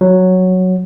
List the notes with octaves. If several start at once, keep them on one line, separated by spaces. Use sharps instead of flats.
F#3